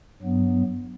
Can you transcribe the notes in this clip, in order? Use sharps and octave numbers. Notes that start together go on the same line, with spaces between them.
G2 F#3 B3